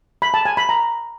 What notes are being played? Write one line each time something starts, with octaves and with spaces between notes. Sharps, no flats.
B5
A5
G#5
B5
A#5